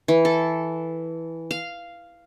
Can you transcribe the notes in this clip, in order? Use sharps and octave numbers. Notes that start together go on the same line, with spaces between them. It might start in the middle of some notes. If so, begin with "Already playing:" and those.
E3
A4
F5